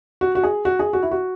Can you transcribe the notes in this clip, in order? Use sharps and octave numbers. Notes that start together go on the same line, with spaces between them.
F#4
F#4
G#4
F#4
G#4
F#4
E4
F#4